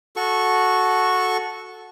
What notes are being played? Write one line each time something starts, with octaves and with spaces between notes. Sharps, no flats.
F#4 A4 C#6